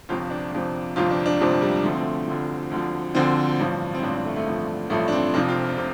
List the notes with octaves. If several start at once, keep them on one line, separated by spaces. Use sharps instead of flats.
G1 F2 C3 F3 F4
D4
G1 F2 C3 F3
G1 F2 C3 F3 F4
D4
D4
G1 F2 C3 F3
G3
D2 D3 F3 A3
C4
A3
D2 D3 F3
D2 D3 F3
D2 D3 F3 C4
A1 G2 F3
C4
A1 G2 F3 D4
C4
A3
A3
A1 G2 F3
A1 G2 F3 A3
D4
C4
F1 F2 C3 F3 D4
F4
C3